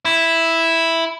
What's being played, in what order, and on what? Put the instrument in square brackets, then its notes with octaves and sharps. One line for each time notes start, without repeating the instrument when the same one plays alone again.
[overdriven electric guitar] E4